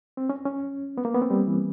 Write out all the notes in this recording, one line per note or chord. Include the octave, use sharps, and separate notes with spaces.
C4
C#4
C#4
B3
A#3
B3
C4
G3
E3